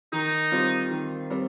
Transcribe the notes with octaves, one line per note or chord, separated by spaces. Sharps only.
D#3 D#4
G3 C4 F4
D#3
G3 C4